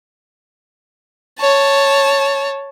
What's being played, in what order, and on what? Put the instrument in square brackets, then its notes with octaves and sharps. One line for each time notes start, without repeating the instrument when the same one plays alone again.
[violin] C#5 A5